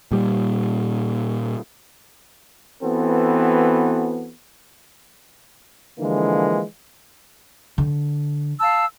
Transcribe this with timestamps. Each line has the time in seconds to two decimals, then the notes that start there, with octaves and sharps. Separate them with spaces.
0.12 A#2 G3
2.81 E3 B3 C4 F#4 A4
5.99 D3 E3 F3 G#3 A#3
7.78 D3
8.60 F5 A5 E6